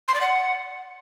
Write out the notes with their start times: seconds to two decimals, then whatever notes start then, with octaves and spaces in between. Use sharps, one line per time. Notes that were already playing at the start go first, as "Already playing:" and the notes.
0.08 C6
0.14 D5
0.21 F#5